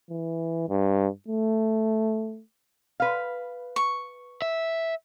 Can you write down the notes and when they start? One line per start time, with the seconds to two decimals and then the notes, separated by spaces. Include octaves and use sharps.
0.10 E3
0.69 G2
1.28 A3
3.00 B4 F5
3.76 C#6
4.42 E5